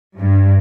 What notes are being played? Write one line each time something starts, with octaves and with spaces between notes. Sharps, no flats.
G2